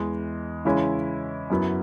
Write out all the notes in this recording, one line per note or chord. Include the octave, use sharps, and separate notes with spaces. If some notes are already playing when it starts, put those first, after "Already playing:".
Already playing: E2 E3 G#3
C#3 E3 G#3 C#4 E4
F#2 F#3 B3 E4